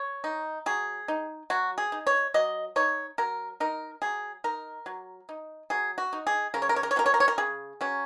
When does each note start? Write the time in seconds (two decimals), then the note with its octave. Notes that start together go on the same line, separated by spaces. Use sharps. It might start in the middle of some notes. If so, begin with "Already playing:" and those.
Already playing: C#5
0.24 D#4
0.66 F#3 G#4
1.08 D#4
1.50 F#3 F#4
1.78 G#4
1.92 D#4
2.07 C#5
2.34 F#3 D#5
2.76 D#4 C#5
3.18 F#3 A#4
3.60 D#4 A#4
4.02 F#3 G#4
4.44 D#4 A#4
4.86 F#3
5.29 D#4
5.70 F#3 G#4
5.98 F#4
6.13 D#4
6.27 G#4
6.54 C#3 A#4
6.62 C#5
6.69 A#4
6.76 C#5
6.83 A#4
6.91 C#5
6.96 F#3 C#4 A#4
7.06 C#5
7.14 A#4
7.20 C#5
7.28 A#4
7.38 C#3 G#4
7.81 F#3 C#4